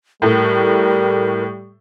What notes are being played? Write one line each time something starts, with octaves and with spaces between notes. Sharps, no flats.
A2 G3 A3 A#4